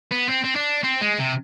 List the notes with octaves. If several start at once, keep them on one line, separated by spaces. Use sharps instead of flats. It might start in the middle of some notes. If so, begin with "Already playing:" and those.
B3
C4
C4
D4
C4
G#3
C3